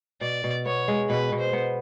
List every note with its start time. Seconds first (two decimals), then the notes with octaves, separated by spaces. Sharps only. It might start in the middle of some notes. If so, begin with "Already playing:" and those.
0.21 B2 D5
0.44 B2
0.66 B3 C#5
0.88 G#3
1.09 B2 B4
1.32 B2
1.39 C5
1.53 B3